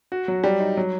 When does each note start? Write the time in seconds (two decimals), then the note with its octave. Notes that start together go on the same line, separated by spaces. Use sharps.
0.12 F#4
0.28 F#3
0.44 G3
0.60 D#4
0.77 F#3